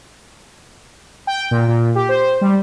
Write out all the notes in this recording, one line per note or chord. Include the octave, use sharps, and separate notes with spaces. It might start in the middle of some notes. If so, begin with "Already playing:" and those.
G5
A#2
A#2
G4
C5
G3